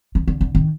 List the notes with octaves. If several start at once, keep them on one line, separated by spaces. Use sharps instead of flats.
D#3
D3
D3
D#3